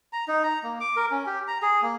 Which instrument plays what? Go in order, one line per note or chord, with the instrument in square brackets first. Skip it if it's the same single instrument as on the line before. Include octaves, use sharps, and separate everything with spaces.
[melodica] A#5
D#4
A#5
A#3
D6
A#4
C#4
G4
A#5
G#4
A#3